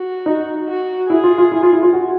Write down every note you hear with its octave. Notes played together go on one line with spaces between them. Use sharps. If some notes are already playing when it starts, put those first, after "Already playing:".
Already playing: F#4
D#4
F#4
E4 G#4
F4
F4
E4
F4
E4
F4
F#4